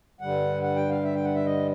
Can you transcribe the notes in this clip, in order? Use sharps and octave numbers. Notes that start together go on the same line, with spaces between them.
G2 D3 G3 F#5
F#5
G5
F5
E5
G5
F#5
E5
D#5